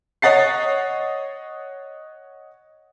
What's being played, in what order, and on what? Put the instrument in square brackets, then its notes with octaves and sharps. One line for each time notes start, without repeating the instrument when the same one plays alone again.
[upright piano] C#5 D#5 F#5 A6 C7